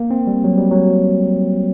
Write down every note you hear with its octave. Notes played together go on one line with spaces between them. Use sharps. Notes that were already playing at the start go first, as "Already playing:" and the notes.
Already playing: A#3
C4
G3
F#3
G3
F#3